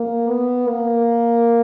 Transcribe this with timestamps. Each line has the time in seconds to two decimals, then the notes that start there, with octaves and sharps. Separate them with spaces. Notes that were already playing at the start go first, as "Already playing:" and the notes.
Already playing: A#3
0.29 B3
0.68 A#3